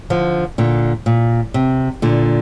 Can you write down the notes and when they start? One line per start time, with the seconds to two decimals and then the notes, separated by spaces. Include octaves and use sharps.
0.10 D3 F3
0.58 A#2 D3
1.06 A#2
1.54 C3
2.02 A#2 D3